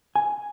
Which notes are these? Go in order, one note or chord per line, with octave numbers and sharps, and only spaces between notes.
G#5